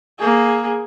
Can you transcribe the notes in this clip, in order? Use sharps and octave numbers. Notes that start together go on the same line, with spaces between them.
A#3 G#4